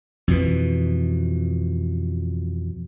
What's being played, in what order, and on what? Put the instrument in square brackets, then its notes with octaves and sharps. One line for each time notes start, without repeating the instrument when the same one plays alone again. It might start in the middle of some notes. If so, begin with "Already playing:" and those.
[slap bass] F2 B2 E3